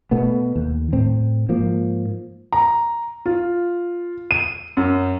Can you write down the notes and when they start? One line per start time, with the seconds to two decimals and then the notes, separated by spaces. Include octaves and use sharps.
0.11 B2 A3 B3
0.56 D#2
0.93 A2 C4
1.49 G#2 F3 A#3
2.53 A#5
3.26 F4
4.31 D#7
4.77 F#2